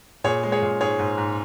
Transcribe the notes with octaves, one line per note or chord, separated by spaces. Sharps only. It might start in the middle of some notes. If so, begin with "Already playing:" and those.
A#2 G#4 C#5
G#3
G#4 C#5
A#2
G#2 G#4 C#5
G#2
G#2